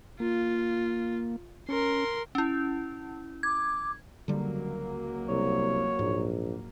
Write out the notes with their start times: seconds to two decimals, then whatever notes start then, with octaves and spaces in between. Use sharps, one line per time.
0.20 A#3 F4
1.69 C#4 A#4 C6
2.35 C#4 E4
3.43 D6 G#6
4.28 C#2 D3 F#3 G3 A#3
5.29 C2 C#5
5.99 A#1 G#2